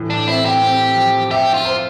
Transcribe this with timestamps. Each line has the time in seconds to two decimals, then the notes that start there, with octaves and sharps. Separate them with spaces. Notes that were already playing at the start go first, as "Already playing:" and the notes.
Already playing: A2 E3
0.10 D4
0.28 C4 E4
0.45 G4
0.63 C4
0.96 F3
1.31 G4 E5
1.54 F4
1.65 C5